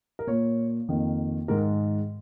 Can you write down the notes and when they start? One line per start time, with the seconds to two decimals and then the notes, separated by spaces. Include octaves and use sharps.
0.19 A#4
0.27 A#2 A#3 C#5
0.88 F2 D#3 A#3
1.48 G#2 D#3 G#3 A#4